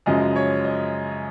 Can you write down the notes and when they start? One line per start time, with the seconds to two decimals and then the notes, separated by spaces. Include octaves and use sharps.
0.06 F#2 C#3 F3 G#3 D#5
0.36 C#5
0.64 D#5